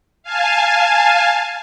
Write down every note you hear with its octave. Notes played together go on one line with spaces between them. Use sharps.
F5 G#5 A5